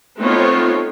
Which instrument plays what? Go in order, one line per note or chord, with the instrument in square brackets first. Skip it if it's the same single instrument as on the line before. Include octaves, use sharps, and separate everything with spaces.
[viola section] A3 B3 C4 D#4 F4 C#5